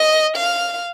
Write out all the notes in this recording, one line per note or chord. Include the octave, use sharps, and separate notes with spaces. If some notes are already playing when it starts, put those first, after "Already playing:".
Already playing: D#5
F5